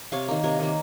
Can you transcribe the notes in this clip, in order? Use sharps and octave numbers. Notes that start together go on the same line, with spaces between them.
C3 C#5 F5
D#3 A#3
C3 A#4 C#5
D#3 A#3